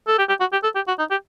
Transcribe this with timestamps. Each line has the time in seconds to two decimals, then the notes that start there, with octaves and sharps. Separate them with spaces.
0.07 A4
0.18 G4
0.29 G4
0.40 F#4
0.52 G4
0.63 A4
0.75 G4
0.88 F#4
0.99 D#4
1.11 G4